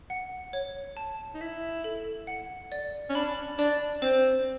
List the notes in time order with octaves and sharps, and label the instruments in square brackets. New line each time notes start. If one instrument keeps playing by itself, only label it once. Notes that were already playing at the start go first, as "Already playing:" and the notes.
[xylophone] F#5
C#5
A5
[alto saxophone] D#4
[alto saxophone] E4 [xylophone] E5
[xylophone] A4
F#5
D5
[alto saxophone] C#4
[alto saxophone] D4 [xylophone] B5
[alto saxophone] D4 [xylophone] D5
[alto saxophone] C4 [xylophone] C5